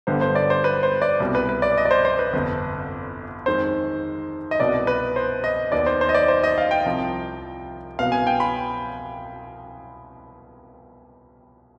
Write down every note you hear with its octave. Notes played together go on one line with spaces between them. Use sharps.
G1 G2 D3 G3 B3 C5
C5
D5
C5
B4
C5
D5
C2 B2 G3
B4
B4
D5
D#5
D5
C5
C5
B4
G1 F2 C3
F2 D#3 G#3 C5
D#5
C2 B2 B3 D5
B4
C5
D#5
D#2 D#3 B3 D5
C5
C5
D#5
D5
C5
D#5
F5
G5
C2 C3 F3
C2 B2 B3 F5
G#5
G5
B5